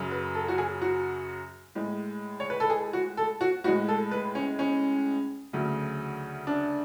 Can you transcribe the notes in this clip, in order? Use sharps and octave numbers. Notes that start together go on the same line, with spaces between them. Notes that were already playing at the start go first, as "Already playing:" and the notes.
Already playing: F#2 C#3 F#3
B4
A4
F#4
G#4
F#4
A2 G#3
C#5
B4
A4
G#4
F#4
A4
F#4
A2 G#3 F#4
A4
B4
C#4
C#4
D2 C#3 F#3 A3
D4